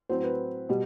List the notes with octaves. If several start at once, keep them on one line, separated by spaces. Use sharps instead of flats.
A2 F#3 C4 C5
B4
B2 G3